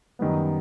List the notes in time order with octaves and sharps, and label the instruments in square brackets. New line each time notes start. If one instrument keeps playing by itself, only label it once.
[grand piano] F#2 D#3 G3 B3